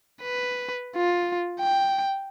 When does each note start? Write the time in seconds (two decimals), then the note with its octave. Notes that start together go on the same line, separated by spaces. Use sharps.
0.22 B4
0.96 F4
1.60 G5